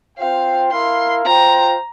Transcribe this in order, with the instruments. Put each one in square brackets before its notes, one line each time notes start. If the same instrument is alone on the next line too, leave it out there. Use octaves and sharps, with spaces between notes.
[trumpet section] C4 F4 C5 G5 [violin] F5
[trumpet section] E4 A#4 F5 [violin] C6
[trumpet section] F4 C5 G5 [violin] A#5